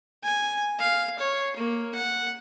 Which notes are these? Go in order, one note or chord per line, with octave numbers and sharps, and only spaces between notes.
G#5
F5
C#5
A#3
F#5